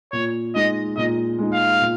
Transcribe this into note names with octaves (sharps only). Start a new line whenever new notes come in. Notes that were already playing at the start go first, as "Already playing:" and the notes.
A#2 C#5
G#3 D#4 D#5
A#2 D#5
G#3 D#4
F5
A#2